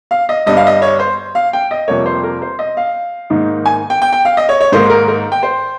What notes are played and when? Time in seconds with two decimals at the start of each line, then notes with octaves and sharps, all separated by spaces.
0.11 F5
0.29 D#5
0.46 G1 G2 G3 D#5
0.57 F5
0.67 D#5
0.82 C#5
1.00 C5
1.35 F5
1.53 G5
1.71 D#5
1.88 F2 C3 G3 A#3 C#5
2.06 C5
2.24 A#4
2.42 C5
2.59 D#5
2.77 F5
3.30 G#2 D#3 A#3 D#4
3.66 G#5
3.90 G5
4.02 G5
4.13 G5
4.25 F5
4.37 D#5
4.49 C#5
4.61 C#5
4.72 G#2 D#3 A#3 D#4 C5
4.90 A#4
5.08 A#4
5.32 G5
5.43 C5